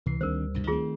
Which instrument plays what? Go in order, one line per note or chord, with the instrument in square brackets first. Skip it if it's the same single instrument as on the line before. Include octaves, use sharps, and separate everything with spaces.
[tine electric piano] C#2 E3 C7 [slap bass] C3
[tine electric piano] D2 G3 [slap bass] D#3 C4 D4 [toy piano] A#4 C5
[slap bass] C2 G2 B2
[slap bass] D#3 A3 C4 [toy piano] F4 G#4